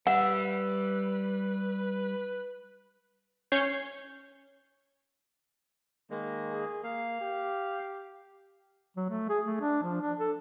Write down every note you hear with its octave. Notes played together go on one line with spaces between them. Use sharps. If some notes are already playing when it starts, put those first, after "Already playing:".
G3 B4 E5 F#5
C#4 C#5 G6 C7
D#3 G#3 A#3
G#4
A#3 F5
G4
F#3
A3
G#4
A3
D4
F3
D4
A4